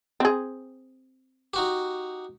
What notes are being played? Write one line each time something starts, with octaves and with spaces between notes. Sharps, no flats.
C4 G#4
D#4 F#4 G4